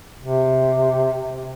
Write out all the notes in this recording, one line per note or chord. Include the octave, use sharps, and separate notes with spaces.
C3